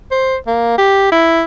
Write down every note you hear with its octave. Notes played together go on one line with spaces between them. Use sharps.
C5
A#3
G4
E4